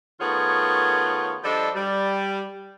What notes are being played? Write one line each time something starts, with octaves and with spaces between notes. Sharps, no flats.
D#3 A3 B3 F4 G#4 C#5
F3 G3 D4 A4 C5 D#5
G3